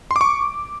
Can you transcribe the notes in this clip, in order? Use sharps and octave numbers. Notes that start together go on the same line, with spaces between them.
C6
D6
C#6